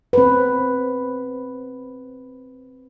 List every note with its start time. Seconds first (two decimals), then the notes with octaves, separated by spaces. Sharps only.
0.13 C4 B4